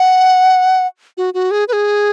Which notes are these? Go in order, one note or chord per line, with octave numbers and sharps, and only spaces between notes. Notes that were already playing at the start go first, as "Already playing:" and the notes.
Already playing: F#5
F#4
F#4
G#4
B4
G#4